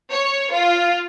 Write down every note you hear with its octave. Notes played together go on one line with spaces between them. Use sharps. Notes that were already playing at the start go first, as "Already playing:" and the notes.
C#5
F4